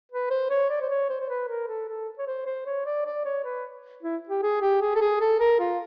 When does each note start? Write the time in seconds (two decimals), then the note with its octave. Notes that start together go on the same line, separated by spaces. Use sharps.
0.12 B4
0.31 C5
0.50 C#5
0.70 D5
0.81 C5
0.90 C#5
1.09 C5
1.20 C5
1.29 B4
1.48 A#4
1.68 A4
1.88 A4
2.18 C#5
2.27 C5
2.46 C5
2.66 C#5
2.86 D5
3.05 D5
3.25 C#5
3.44 B4
4.03 E4
4.29 G4
4.42 G#4
4.61 G4
4.81 G#4
4.95 A4
5.01 G#4
5.21 A4
5.40 A#4
5.59 F4